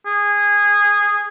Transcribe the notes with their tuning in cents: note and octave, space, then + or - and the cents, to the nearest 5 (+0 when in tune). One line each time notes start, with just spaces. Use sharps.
G#4 -15